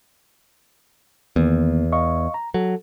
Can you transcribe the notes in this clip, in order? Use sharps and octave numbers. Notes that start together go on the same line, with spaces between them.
E2 D#3 A#3 B3
D#5 F5 C#6
A#5
F#3 A4